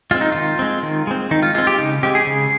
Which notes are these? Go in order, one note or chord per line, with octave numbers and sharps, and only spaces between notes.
G#3 C4 F4
D#4
D#3 F4
G#3 C4
D#3
G#3 C4
D#3 D#4
F4
G#3 C4 F4
G4
C#3 D#4
G#3 C4 G4
G#4
C#3